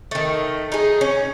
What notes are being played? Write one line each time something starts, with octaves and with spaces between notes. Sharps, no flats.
D#3 A3
D#4 G#4
C#4